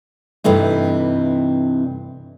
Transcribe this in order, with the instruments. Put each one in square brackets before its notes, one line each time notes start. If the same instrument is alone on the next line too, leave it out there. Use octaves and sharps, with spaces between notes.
[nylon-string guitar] G2 C3 E3 A3 D#4